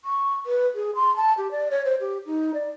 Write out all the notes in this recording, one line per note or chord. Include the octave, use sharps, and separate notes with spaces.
C#6
B4
G#4
C6
A5
G4
D5
C#5
C5
G4
D#4
D5